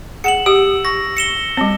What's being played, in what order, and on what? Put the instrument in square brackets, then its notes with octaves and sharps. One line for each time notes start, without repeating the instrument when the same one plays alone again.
[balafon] G#4 F#5 [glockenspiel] C#7 E7 F#7
[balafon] G4 [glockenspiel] E6
[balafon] C#6 [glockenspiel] A#6
[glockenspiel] C#7 E7 G7
[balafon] G3 C4